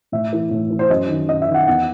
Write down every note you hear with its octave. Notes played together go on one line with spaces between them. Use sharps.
A2 E5
E3
A2
E3
C5
F#2 D#5
D#3
F#2 D#5
E5
D#3
F#5
E2 F#5